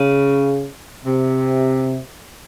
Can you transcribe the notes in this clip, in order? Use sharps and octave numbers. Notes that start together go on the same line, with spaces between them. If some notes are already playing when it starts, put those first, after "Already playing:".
Already playing: C#3
C3